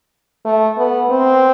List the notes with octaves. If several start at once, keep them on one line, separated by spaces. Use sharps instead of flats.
A3
B3
C4